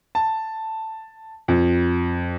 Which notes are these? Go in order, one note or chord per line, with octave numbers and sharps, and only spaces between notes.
A5
F2